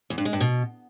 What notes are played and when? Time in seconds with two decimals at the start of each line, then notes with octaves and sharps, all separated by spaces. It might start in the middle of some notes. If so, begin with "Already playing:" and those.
0.10 E2
0.18 G2
0.25 G#3
0.33 G2
0.40 B2